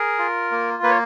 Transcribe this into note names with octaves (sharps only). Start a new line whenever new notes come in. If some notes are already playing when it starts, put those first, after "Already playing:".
Already playing: G#4 A#4
F4
A#3
A#3 B4
C#5